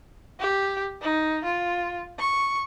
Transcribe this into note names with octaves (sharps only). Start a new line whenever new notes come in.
G4
D#4
F4
C#6